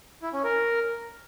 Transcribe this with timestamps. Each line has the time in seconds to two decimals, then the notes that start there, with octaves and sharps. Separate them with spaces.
0.22 E4
0.33 C#4
0.44 A#4